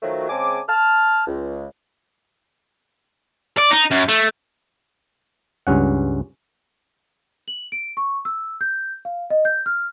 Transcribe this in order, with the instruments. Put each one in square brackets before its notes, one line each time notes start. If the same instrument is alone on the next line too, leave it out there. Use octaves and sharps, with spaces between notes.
[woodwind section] D#3 F3 F#3 A3
C#3 G#3 C4 G#5 A5 D6
A5 F6
C#2
[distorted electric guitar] D5
D#4
F#2
A3
[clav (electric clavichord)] C#2 G2 C#4 F#5
[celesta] F#7
D7
C#6
E6
G6
F5
D#5
G6
F6